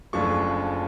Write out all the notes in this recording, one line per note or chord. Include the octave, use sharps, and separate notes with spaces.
F#1 F#2 F3 A3 D4 C#6